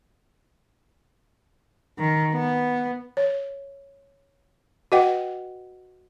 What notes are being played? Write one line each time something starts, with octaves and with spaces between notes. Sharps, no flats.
D#3
B3
C#5
F#4 B4 D#5 F#5 G5